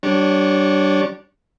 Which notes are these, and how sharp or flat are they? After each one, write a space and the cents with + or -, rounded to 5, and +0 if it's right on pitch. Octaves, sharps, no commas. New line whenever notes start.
G3 -35 D4 -5 C#5 -15